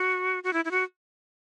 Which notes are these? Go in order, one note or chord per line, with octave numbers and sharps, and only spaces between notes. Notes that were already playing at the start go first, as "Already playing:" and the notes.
Already playing: F#4
F#4
E4
E4
F#4